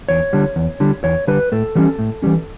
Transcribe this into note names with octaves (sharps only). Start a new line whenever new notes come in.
E2 C#5
D3 G3
E2
D3 G3
E2 C#5
D3 G3 B4
A2 A4
E3 G3 C#4
A2
E3 G3 C#4